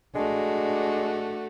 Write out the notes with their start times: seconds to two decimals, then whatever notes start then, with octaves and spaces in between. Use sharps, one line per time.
0.15 G#3 A3 D4 F#4